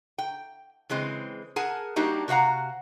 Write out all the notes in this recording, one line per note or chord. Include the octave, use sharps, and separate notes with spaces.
G5
C#3 E3 G#3 C4
G#4 A#4 F#5 G#5 A5
G3 A#3 D4 D#4 F#4 G4
C3 F#4 F5 F#5 A#5